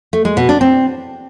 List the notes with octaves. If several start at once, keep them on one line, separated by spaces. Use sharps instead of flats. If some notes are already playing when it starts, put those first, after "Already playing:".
A3
G#3
B2
D4
C4